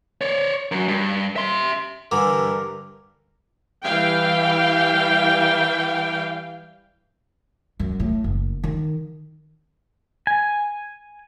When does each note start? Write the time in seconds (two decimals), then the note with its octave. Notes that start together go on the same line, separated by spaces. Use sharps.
0.21 C#5 D5
0.72 F#2 F#3
0.88 G2
1.36 E5 C6
2.12 G2 D3 E3 A#4 D6
3.85 E3 G3 F5 G5
7.80 F#2
8.00 A2
8.24 F#1
8.64 D#3
10.27 G#5